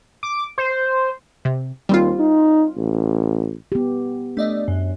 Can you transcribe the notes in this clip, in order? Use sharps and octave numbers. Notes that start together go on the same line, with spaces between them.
D6
C5
C3
D#2 G3 C4 F4
D#4
A1
B3 G4
A3 D4 D5 D#5
F#2